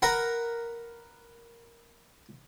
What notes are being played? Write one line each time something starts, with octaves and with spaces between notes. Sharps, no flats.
A#4 B4 F#5